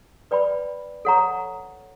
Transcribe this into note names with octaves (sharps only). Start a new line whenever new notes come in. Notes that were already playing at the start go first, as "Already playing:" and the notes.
B4 D5 G5 B5
A4 C#5 F#5 A#5 C#6